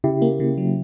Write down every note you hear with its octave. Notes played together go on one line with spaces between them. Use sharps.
C#3 E4 G4
A#3
C#3
F#3